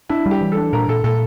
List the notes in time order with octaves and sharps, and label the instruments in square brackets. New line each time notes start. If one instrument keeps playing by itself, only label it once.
[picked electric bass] D4 [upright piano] E4
[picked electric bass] G3
[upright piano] G4
[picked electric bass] E3
[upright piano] A4
[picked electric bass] D4
[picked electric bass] A#2 [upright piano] A#4
[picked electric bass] A#2 [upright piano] A4
[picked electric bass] A#2 [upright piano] A4